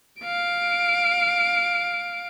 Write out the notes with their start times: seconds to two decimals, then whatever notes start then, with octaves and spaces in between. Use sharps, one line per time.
0.20 F5 D7